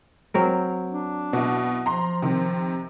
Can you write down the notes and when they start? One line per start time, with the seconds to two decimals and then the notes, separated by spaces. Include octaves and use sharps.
0.34 F#3 C4 A#4
0.91 D4
1.33 B2 E4
1.86 F3 A#5 C6
2.22 C3 D#3